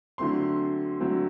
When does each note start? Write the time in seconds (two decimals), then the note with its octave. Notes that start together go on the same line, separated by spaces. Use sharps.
0.18 D3 F#3 A3 C4 C6
1.00 D3 F#3 A3 C4